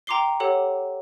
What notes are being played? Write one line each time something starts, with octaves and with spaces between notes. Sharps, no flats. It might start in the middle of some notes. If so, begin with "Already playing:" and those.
G5 A#5 C6 D6 C7 G7
G4 A4 C#5 F#5